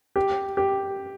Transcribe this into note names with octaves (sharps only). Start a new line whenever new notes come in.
G4
G4